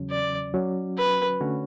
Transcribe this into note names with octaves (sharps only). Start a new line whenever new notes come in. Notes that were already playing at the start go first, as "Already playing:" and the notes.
Already playing: E2 C#3 F#3 C#4
D5
F#3 C#4 F#4
B4
D3 A3 C#4 F#4 C#5